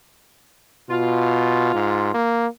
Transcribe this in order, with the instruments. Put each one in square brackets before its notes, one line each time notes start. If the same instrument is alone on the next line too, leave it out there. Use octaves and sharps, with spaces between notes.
[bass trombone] B2 [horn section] F4
[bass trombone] G#2
A#3